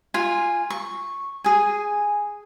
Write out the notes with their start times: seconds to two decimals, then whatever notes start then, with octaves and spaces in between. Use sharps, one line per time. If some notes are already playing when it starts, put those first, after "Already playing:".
0.14 F4 G#5
0.70 C#6
1.44 G#4 G#5